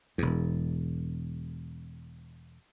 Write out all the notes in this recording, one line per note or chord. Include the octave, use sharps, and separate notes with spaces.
E1 E2